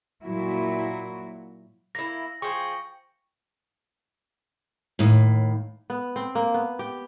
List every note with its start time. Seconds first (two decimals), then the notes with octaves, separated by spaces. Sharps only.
0.23 A#2 F#3 E4 F#4
1.95 A#3 E4 A#6
2.42 F3 G#4 G5 C#6
4.99 D#2 A2
5.90 B3
6.16 C4
6.35 A#3
6.54 B3
6.79 G4